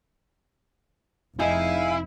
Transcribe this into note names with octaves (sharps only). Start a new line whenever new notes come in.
F1 D#4 E4 G#4 F5 G#5